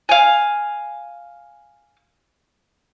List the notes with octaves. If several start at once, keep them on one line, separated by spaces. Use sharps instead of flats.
F5 G#5